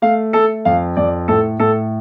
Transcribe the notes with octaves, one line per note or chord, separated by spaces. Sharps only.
A3 F5
A3 A4
F2 F5
F2 D5
A2 A4
A2 A4